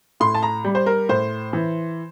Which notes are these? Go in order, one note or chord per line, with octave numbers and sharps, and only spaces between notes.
A2 C6
A5
A#5
G3
C5
A#4
A2 C5
E3